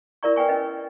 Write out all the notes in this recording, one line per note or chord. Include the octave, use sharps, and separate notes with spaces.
E4 A#4 D5 A#5 C#6
B4 G5 G#5 C#6
C#4 B4 D#5